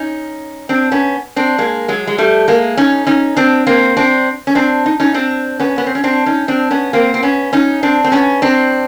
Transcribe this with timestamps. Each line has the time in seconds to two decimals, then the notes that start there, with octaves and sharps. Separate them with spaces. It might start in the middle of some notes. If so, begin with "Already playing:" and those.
Already playing: C#4 D#4
0.69 C4 D4
0.92 B3 C#4
1.36 C4 D4
1.58 G#3 A#3
1.88 F#3 G#3
2.07 G#3
2.18 G3 A3
2.48 G#3 A#3
2.77 C#4 D#4
3.07 C#4 D#4
3.37 C4 D4
3.67 A#3 C4
3.97 C4 D4
4.47 C#4
4.55 C4 D4
4.86 D#4
5.00 C#4 D#4
5.14 C4 D4
5.60 B3 C#4
5.78 B3
5.87 C4
5.95 C#4
6.04 C4 D4
6.26 C#4 D#4
6.48 C4 D4
6.71 B3 C#4
6.93 A#3 C4
7.14 C4
7.23 B3 C#4
7.53 C#4 D#4
7.83 C4 D4
8.04 C4
8.12 B3 C#4
8.42 C4 D4